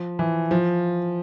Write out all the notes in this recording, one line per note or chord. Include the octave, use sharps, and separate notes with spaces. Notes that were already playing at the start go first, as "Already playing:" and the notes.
Already playing: F3
E3
F3